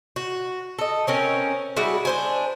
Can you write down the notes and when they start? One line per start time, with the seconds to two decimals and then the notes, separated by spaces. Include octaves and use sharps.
0.16 F#4
0.79 A4 D#5
1.07 C4 C#4 A#4
1.77 G3 G#3 E4 F#4
2.05 D4 C5 G#5